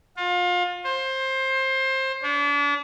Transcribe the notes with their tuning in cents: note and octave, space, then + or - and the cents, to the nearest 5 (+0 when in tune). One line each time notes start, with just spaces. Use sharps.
F4 +30
C5 +20
D4 -35